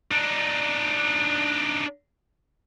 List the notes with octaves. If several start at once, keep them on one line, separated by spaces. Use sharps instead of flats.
D4 D#4